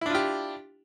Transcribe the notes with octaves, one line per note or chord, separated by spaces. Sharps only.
D4 E4 F4 G4